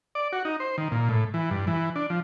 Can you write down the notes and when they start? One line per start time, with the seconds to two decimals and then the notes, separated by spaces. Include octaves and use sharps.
0.15 D5
0.33 F#4
0.45 D#4
0.60 C5
0.78 D#3
0.92 A#2
1.09 A2
1.34 E3
1.51 G2
1.67 E3
1.96 D4
2.10 F3